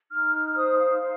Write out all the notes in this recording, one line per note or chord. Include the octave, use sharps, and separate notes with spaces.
D#4 F6
F6
F6
C5 D#6
F5
C5